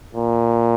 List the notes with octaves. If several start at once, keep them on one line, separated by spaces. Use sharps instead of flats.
A#2